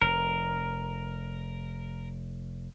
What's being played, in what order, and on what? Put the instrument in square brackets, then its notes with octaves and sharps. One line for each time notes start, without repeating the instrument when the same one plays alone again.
[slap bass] F1 [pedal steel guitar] A#4